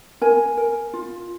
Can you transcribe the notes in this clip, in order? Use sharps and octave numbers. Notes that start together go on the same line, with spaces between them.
A#4 G#5
A#4
F4